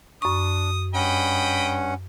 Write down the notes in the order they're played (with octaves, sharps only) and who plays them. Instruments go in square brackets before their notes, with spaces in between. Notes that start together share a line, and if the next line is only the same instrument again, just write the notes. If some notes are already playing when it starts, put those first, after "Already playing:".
[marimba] F#2 C#6 [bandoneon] D4 [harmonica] D#6
[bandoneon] G2 C#4 F#5 [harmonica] D#5 G5 B5